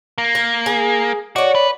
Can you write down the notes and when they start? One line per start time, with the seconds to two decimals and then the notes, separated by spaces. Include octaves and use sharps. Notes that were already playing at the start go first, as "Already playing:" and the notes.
0.18 A#3
0.35 A#4
0.66 G#4
1.36 F#4 C#5 D5
1.55 B4